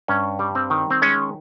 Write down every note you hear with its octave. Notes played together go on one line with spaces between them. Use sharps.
G2 C#4
G3
C4
D#3
C4
G#3 C#4